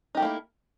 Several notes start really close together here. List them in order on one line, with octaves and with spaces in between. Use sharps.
D#4 G4 A3 A#3 E4